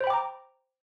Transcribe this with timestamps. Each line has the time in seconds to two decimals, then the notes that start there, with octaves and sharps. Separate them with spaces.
0.01 C5
0.04 B5
0.07 G5
0.10 D6
0.14 A#5